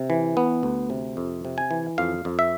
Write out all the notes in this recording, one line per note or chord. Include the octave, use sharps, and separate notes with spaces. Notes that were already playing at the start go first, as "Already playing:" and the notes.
Already playing: C3
E3
B3
D2
C3
F2
C3
G#5
E3
F2 F5
F2
E5